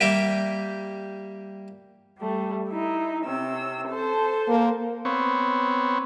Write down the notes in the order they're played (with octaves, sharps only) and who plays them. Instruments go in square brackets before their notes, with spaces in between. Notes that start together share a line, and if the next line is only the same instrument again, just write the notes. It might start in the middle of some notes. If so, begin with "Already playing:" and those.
[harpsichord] G3 A#3 G4 E5 G5
[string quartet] G3 A3
D#4 E4
C3 C#4 E6
A4 C5 A5
[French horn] A#3
[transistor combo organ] B3 C4 C#5